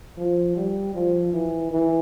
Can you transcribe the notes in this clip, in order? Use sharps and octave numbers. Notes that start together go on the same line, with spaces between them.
F3
G3
F3
E3
E3